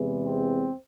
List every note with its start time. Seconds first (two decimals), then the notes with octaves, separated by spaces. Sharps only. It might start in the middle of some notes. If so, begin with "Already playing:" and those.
Already playing: E2 C3 E3 G#3
0.24 C4